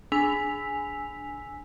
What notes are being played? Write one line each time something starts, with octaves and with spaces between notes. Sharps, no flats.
D4 G#5 E6 B6 F7